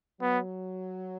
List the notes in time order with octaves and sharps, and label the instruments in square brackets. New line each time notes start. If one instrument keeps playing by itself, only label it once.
[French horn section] F#3 [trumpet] B3